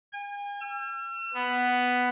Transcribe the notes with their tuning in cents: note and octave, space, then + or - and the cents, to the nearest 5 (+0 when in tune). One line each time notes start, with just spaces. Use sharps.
G#5 -40
E6 +45
B3 +5